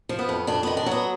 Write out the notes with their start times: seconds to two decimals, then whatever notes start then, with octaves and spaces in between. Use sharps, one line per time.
0.09 F3
0.19 B3
0.29 F2
0.47 F2 D4
0.63 D#3 B3
0.77 D4
0.86 F#3
0.91 B3